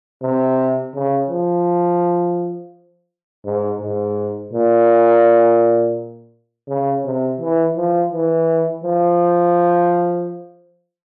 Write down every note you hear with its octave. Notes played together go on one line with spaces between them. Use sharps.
C3
C#3
F3
G#2
G#2
A#2
C#3
C3
E3
F3
E3
F3